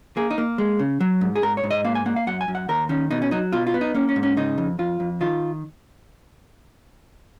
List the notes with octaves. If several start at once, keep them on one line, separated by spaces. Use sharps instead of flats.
A#3 G#4
D#4
A#3
G#3
C#3
F#3
G#2
G#4
G#2 A#4
C#5
G#2
D#5
A#3 F5
G#5
A#3 F#5
F5
F#2 F#5
G#5
F#2
F#5
D#2 A#4
D#3 C#4
B2 D#4
C#4
F#3 D#4
B2 F4
F4
B3
D#4
A#3 C#4
C#4
G#2
C#4
C#3 D#4
F2
F2 F4
F2
D#3 F4